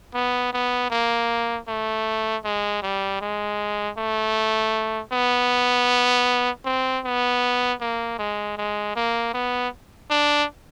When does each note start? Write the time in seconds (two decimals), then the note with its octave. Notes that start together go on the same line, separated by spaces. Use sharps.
0.14 B3
0.53 B3
0.90 A#3
1.68 A3
2.44 G#3
2.82 G3
3.21 G#3
3.98 A3
5.13 B3
6.65 C4
7.05 B3
7.80 A#3
8.19 G#3
8.57 G#3
8.96 A#3
9.34 B3
10.10 D4